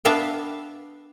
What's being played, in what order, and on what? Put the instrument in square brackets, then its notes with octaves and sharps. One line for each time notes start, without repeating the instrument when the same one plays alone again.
[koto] B3 D4 B4 E5 F5 G5